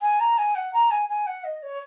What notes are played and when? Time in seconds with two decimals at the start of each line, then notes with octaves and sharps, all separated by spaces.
0.02 G#5
0.20 A#5
0.38 G#5
0.55 F#5
0.73 A#5
0.91 G#5
1.09 G#5
1.26 F#5
1.44 D#5
1.63 C#5